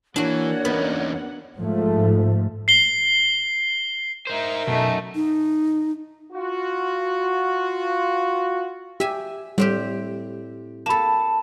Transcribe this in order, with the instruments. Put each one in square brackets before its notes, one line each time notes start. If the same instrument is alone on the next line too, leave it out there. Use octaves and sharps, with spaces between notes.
[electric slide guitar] E3 [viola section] A#3 F#5 [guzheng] D4 F#4 [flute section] C#5 D5
[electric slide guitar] E2 C#4 D#4 [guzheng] B3
[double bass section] G#2 F3 A3
[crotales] C7 G7
[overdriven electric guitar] D#4 C5 [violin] A#4 E5
[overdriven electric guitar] F#2 [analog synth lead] B2 [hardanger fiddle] A3 D#4
[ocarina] D#4
[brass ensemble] F4 F#4
[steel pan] G4 [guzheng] E5 G#5
[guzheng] A2 C4 G4 [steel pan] G3
[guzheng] A#3 A4 [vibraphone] A5 [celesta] B5 E7